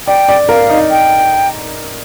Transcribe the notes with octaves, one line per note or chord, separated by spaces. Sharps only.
D5 G5
D5
A#4 F5
D#4
G5